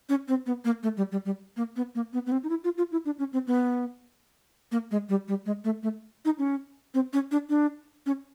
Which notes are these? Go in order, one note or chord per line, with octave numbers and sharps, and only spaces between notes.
C#4
C4
B3
A#3
A3
G3
G3
G3
A#3
B3
A#3
B3
B3
C4
D#4
E4
F4
F4
E4
D4
C#4
C4
B3
A#3
G#3
G3
G3
G#3
A3
A3
D#4
C#4
C4
C#4
D4
D4
C#4